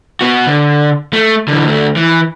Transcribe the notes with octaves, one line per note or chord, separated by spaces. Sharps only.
B3 F#4
D3
A3
D3 E3
D2 A3
E3